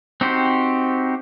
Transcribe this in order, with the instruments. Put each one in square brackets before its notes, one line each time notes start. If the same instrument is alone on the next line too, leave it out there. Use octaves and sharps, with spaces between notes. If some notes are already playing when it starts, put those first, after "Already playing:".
[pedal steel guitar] C4 D#4 F#4 G4 C5